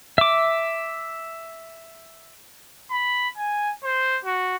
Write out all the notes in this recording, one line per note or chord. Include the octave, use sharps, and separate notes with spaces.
E5 D6
B5
G#5
C5
F#4